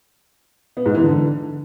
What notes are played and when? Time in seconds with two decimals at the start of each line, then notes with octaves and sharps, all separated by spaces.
0.77 B3
0.86 G#2
0.95 E3
1.04 D3